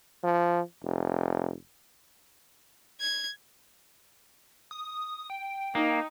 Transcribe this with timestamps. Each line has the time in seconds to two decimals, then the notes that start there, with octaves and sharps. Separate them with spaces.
0.24 F3
0.84 F1
3.01 G#6
4.71 D#6
5.30 G5
5.75 A#3 D#4